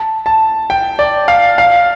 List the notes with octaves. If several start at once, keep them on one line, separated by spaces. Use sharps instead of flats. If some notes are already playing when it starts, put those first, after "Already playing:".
Already playing: A5
A5
G5
D5
F5
F5